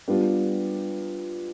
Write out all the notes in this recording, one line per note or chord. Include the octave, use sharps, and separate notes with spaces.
G3 B3 D4 F4